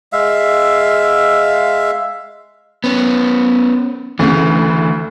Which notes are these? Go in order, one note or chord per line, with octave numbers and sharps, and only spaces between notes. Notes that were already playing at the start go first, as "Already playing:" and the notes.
G#3 E5 F5
B3 C#4
D2 C#3 E3